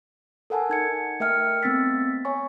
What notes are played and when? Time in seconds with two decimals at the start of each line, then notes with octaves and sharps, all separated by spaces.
0.50 A4 A#4 F#5 G#5 A5
0.70 D#4 G#6 C#7
1.20 A3 A#4 E5 G5 F6 C#7
1.63 A3 B3 C4 E6 A6 B6
2.25 C#5 G#5 C#6